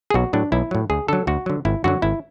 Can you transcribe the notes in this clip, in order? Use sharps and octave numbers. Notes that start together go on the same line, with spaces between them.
G#4
B1 F#4
A2 F#3 D4
B1 E4
A2 F#3
D2 G#4
D3 F#3 A4
D2 F#4
D3 F#3
G#1 E4
F#2 D3 F#3 F#4
G#1 E4